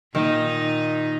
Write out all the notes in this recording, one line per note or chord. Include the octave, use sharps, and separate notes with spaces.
A#2 D#3 D#4